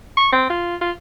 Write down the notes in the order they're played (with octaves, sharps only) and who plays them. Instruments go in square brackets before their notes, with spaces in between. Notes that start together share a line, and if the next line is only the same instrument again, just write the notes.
[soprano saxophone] C#6
C4
F4
F4